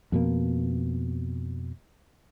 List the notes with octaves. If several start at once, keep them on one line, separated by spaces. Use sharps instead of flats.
F2 B2 A#3